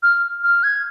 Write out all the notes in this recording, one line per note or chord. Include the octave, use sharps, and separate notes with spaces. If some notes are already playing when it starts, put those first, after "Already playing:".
F6
F6
G#6